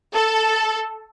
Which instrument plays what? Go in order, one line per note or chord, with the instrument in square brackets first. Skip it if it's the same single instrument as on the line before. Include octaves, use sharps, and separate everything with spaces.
[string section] A4